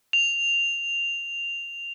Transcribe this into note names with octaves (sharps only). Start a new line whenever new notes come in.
F7